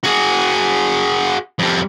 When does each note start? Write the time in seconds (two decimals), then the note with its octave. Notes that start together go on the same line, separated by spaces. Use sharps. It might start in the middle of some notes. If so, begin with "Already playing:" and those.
0.04 F#4 G#4
1.59 F2 G3